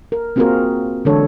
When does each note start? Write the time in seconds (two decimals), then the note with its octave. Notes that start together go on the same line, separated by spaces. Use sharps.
0.12 A#4
0.36 A#3 C4 F4 F#4 G#4 A#4
1.05 D3 E3 G#3 D4 A4 C#5